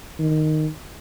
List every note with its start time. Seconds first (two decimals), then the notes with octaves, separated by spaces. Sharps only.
0.19 D#3